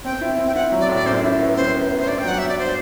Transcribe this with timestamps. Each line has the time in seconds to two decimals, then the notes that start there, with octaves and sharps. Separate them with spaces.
0.04 C4 G5
0.21 E4
0.38 C4
0.47 G5
0.55 E4 F#5
0.72 F#3
0.80 D5
0.89 A2
0.94 D5
1.06 F#2 C5
1.23 E4
1.41 B3
1.56 F#2 C5
1.74 B3
1.90 B3
1.99 C5
2.07 G2 D5
2.19 G5
2.24 F#3 F#5
2.38 G2 E5
2.49 D5
2.59 C5